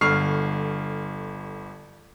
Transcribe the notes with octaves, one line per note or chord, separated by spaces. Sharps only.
G1 D3 C#6 F6 C7